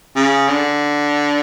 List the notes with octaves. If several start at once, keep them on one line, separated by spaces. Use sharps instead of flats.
C#3
D3